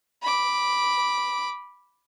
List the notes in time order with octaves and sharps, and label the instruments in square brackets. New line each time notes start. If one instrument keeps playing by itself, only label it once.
[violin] B5 D6